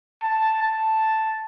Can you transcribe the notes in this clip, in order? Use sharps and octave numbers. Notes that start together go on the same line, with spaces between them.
A5
A5